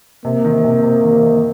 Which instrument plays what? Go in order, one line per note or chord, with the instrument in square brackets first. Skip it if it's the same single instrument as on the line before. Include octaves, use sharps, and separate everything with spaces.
[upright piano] C3 [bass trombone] A#3
[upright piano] D#3
C3
C3
D#3
D#3